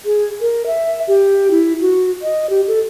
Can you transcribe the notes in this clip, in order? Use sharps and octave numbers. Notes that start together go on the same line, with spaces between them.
G#4
A#4
E5
G4
E4
F#4
D#5
G4
A4